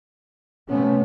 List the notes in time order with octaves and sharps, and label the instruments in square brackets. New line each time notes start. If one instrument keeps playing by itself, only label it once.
[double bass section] C3 A3 B3 [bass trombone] C#4